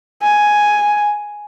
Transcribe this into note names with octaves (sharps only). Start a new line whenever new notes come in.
G#5